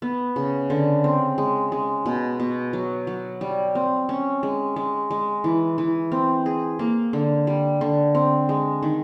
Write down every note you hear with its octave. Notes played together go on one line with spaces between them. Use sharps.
B3
C#3
D3
C4
G#3
G#3
B2
B2
F#3
F#3
G3
C4
C#4
G#3
G#3
G#3
E3
E3
C4
G#4
A#3
D3
G3
D3
C4
G#3
D#3